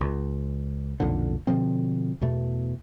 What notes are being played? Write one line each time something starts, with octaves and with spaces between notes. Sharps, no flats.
C#2
B1 F2 A#2 D3
B2 D3 F3 C4
E2 B2 A3